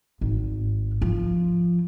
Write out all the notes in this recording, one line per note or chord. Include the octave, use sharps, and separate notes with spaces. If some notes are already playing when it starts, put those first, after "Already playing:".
G#1
F3